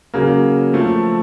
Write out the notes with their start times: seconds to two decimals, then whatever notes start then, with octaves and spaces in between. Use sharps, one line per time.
0.14 C#3 F#3 A#3
0.73 F3 A3 C4